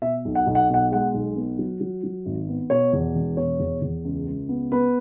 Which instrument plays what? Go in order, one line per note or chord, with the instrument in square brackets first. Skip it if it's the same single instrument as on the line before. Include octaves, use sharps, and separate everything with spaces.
[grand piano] B2 E5
B1
F#5
B1
F#5
B2 F#5
G#3 F#5
B1
B3
F#3
F#3
F#3
G#1
B3
B2 C#5
E2
E1
B2 C#5
E2
E2
C#2
C#2
B3
B3 B4